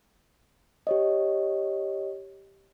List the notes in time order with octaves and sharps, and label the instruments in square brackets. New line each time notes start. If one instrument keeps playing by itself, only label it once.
[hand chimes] G4 C#5 D#5